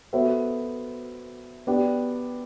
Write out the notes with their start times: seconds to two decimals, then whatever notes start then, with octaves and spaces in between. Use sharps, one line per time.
0.13 B3 F#4 A4 C5 E5
1.67 B3 D4 G4